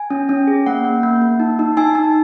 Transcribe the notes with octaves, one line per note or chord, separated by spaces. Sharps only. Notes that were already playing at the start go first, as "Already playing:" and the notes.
Already playing: G#5
C#4
C#4
G#4
A#3 F#5
A#3
A#3
A#3
D#4
D#4
D#4 G#5
D#4